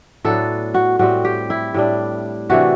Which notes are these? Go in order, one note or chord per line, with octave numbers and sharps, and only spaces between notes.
A2 F#3 B3 D4 A4
F#4
A2 G3 C4 F#4
G4
E4
A2 G3 D4
C3 E3 A3 D4 F#4